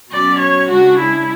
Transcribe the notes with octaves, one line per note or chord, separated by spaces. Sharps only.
B2 F#3 C#4 D5
C#5
C#3 G#3 D4 F#4
E4